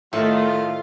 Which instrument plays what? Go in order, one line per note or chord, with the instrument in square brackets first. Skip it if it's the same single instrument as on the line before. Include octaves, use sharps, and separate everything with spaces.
[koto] A2 [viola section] D#3 A3 [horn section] F4